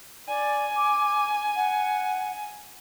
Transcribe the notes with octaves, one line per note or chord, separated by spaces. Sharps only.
D5 G#5
D6
F#5